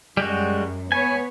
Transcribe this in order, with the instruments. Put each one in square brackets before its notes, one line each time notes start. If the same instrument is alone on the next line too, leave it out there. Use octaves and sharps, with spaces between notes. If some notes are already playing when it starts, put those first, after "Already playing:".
[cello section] F#2 [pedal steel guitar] G3 G#3 F#4
[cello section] B3 B4 C#5 [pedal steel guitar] G#5